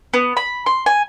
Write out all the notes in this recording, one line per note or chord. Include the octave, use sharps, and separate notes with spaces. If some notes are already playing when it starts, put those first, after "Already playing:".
B3
B5
C6
G#5